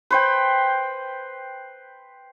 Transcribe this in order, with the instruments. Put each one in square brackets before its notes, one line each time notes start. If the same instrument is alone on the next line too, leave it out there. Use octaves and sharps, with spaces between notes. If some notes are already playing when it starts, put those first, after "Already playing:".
[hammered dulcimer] B4 C5 G5